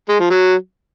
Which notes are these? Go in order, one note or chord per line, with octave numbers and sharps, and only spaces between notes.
G#3
F3
F#3